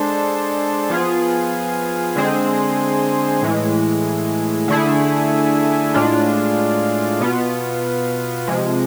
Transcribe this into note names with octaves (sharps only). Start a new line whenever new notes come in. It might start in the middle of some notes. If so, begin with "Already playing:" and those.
Already playing: G#3 D4 A4 C5
F3 B3 F4 G#4
D3 G#3 C4 G#4 C5
A2 E3 G#3
D3 A3 E4 G#4
A2 G#3 D4 F4
B2 B3 F4
C3 F3 G#3